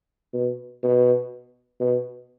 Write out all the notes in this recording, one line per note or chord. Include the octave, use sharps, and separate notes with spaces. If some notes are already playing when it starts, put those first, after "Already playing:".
B2
B2
B2